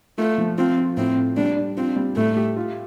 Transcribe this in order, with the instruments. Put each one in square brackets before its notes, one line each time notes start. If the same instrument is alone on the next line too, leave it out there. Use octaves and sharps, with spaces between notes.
[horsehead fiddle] A3 [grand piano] F4
[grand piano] F3
[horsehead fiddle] C4 [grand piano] F4
[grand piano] F4
[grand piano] A2 [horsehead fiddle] C4
[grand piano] A2
[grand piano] G3 [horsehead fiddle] D4
[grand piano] D4
[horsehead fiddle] C4 [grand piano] F4
[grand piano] G3
[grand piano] A2 [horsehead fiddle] A3
[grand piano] G4
F4